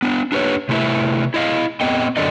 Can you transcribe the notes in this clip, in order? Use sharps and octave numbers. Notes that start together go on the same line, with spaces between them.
B3 D4
D4 G4 B4 C#5
C3 A3 E4 B4 E5
E4 D#5 F5
B3 C4 D#5 G5
F#2 D3 D5 D#5